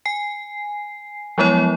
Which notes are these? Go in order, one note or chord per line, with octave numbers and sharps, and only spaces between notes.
G#5 C7
F3 F#3 G#3 B3 E4 C#5